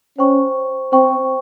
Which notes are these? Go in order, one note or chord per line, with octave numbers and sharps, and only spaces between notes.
C#4 C5 G5 C#6
C4 C5 G5 C#6